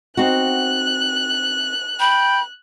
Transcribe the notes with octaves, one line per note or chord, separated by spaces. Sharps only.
C4 D#4 F#4 F#6
G5 B5